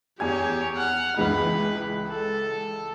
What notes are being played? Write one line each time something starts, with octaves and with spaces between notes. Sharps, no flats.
E2 G4 C#5 G#5 G#6
F#5 F6
C#2 E3 G#3 B4
A4